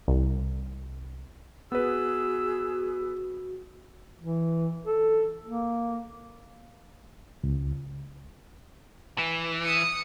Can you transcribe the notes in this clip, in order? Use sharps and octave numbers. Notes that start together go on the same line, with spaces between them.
C2
B3 F#4 G#4 B4 E6
E3
A4
A#3
C#2
E3
D#6 C#7